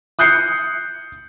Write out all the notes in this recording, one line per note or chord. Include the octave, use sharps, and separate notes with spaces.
D#6 F#6 G6 C7 C#7